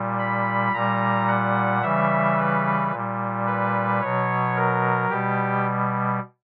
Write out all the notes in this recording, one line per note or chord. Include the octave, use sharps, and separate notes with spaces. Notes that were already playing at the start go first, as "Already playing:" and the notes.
Already playing: A#2 G3
B5
A#2 G3 A#5
F#5
C#3 E3 G3 E5
B4
A#2 G3
B4
B2 F#3 C#5
A#4
B2 G3 G4